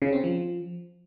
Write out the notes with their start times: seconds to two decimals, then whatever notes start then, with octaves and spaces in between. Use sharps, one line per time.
0.02 C#3
0.13 C4
0.24 F3